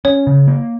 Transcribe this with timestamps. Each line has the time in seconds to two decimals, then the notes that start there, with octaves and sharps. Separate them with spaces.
0.05 C#4 C#5
0.27 C#3
0.48 A#3